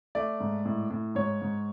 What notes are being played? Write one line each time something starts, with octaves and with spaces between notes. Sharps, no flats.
A3 D5
G#2
A2
A2
G#2 C#5
G#2